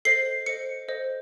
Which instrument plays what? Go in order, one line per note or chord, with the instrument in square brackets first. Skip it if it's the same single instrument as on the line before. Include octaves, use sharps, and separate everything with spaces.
[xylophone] A4 C5 D#5 C7
A4 C5 D#5 C#7
A4 C5 D#5